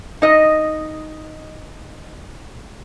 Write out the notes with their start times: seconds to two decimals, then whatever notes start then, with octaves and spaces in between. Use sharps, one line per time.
0.22 D#4 D#5